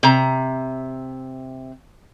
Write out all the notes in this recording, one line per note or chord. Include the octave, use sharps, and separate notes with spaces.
C3 A#5